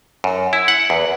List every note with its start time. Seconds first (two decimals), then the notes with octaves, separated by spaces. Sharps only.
0.24 F#2
0.53 E4
0.68 F#5
0.90 E2